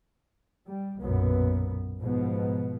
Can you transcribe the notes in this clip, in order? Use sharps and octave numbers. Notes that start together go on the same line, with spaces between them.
G3
B1 F#2 A#2 B3
G#2 B2 F3 B3